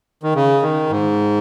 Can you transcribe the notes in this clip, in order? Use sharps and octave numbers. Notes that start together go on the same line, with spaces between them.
D#3
C#3
D#3
G#2